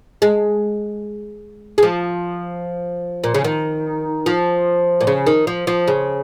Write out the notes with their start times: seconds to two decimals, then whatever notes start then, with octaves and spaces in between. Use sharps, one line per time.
0.22 G#3
1.78 G#3
1.83 F3
3.24 A#2
3.34 C#3
3.44 D#3
4.26 F3
5.01 A#2
5.07 C#3
5.27 D#3
5.47 F3
5.67 F3
5.88 C#3